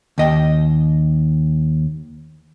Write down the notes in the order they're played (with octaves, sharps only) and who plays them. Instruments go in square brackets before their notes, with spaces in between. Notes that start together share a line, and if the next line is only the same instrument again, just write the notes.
[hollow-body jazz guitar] D#2 D#5 G5